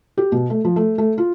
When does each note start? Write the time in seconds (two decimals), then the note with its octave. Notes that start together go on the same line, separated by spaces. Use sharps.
0.17 G4
0.32 B2
0.50 A3
0.65 F3
0.76 A3
0.98 A3
1.18 F4